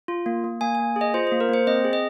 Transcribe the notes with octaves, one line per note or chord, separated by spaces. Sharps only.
F4
A#3
A#3
A#3 G#5
A#3 G#5
G#4
D#5
F4 C5
A#3 C5
A#4
A#3 C5
C4 D#5
G#4
D#5